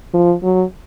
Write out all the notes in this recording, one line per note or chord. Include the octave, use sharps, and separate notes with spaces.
F3
F#3